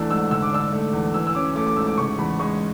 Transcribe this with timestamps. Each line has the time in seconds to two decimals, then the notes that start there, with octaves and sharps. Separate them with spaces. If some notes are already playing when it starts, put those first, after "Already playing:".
Already playing: E2 E3 A3 D4 E6
0.10 G#2 E6
0.31 D3 E6
0.42 D6
0.52 D4 E6
0.73 A3
0.93 E2
1.14 E3 E6
1.27 E6
1.35 C#4 D6
1.56 A3 D6
1.67 D6
1.76 G#2 E6
1.87 D6
1.98 C#3 C#6
2.19 E2 B5
2.39 G#3 C#6